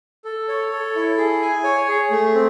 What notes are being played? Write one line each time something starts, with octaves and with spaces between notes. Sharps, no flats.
A4
C#5
A4
E4
G#4
G#5
C#5
G#4
A3
C4